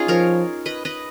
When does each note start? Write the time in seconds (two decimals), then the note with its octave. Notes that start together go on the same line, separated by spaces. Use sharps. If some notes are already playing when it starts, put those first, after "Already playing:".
Already playing: C#4 D#4 F4 G#4
0.08 F3 A#4 C#5
0.66 B4 D#5
0.85 B4 D#5